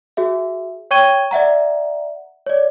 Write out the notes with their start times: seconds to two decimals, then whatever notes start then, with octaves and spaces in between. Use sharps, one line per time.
0.17 F#4 G#4 E5
0.91 C#5 G5 C#6 G#6 D#7 G7
1.31 D5 E5 F#5 A#5
2.46 C#5 D5